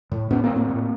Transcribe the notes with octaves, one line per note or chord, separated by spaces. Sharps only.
A2
A2 B3 C#4
A#3 C4
A2
A#3 C4
A2